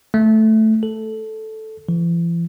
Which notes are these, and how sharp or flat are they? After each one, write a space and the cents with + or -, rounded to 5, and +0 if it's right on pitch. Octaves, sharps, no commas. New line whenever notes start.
A3 -5
A4 -5
E3 +45